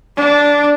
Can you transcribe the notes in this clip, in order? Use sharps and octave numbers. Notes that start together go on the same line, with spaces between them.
D4